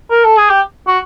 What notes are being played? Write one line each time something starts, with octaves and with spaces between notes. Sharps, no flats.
A#4
A4
G#4
G4
F#4